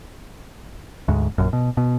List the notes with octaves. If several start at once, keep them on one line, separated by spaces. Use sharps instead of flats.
D2 G#2
A#1 F#2
B2
B2